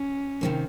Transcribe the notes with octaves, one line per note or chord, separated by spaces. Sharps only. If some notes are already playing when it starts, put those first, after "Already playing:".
Already playing: C#4
C3 D#3 F#3 A#3